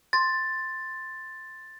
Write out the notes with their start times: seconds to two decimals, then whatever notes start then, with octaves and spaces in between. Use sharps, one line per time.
0.13 C6 A6